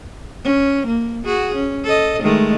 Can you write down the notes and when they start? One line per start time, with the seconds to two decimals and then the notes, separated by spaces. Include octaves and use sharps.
0.44 C#4
0.86 A#3
1.25 F#4 G#4
1.55 C#4
1.84 A4 D#5
2.22 D#3 G#3 A3